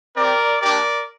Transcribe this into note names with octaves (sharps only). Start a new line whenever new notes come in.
C4 G4 A#4 D5
A#3 D4 G4 A#4 D5